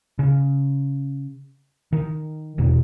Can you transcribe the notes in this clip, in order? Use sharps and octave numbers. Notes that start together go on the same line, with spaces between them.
C#3
D#3
D#1 E2 B2 D#3